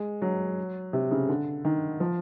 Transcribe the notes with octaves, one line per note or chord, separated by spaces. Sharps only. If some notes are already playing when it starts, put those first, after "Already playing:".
Already playing: G#3
F#3
C3
C#3
D3
D#3
F3